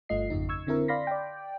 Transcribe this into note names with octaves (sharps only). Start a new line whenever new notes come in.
G1 G2 A3 F4 D#5 C7
G#1 F2 C#3 D#4
C#6 E6 G#6
D3 C4 E4 A#4
D5 F5 B5 C6 A#6 B6
D5 G5